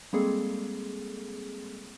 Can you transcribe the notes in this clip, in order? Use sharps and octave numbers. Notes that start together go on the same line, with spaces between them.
G3 G#3 A#3 C4 G#4 A4